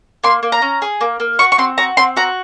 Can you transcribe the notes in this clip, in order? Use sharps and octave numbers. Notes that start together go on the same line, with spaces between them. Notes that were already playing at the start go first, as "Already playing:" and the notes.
A#3 C6
A#3
A#5
C#4
G#4
A#3
A#3
F#4 C#6
C#6
C4 C6
F#4 A#5
C4 C6
F#4 A#5